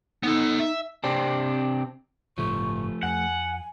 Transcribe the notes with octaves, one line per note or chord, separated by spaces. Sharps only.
B3 D#4 A4
E5
C3 C4 D4
G1 A2 C#3 F3 A3 C#6
F2 F#5 G#5